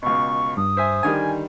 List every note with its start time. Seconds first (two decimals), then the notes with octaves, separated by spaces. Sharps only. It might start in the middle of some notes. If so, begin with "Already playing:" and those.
0.02 C#2 B2 C#6
0.57 G2 D#6
0.77 C5 E5 G#5
1.03 D3 D#3 G3 G#5